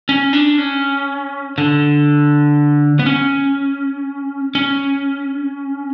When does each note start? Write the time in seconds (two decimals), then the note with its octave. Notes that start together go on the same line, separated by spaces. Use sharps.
0.09 C#4
0.33 D4
0.58 C#4
1.58 D3
2.99 B3
3.06 C#4
4.55 C#4